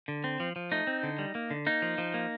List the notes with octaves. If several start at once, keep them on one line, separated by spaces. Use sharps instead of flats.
D3
C4
F3
F3
A3 D#4
C4
D3
G3
A#3
D3
A#3 D#4
F3
F3
A#3